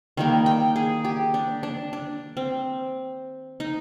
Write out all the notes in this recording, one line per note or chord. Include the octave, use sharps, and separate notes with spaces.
D#3 G3 A#3
G5
G#4
G4
D4
D4
D4
C4
D#4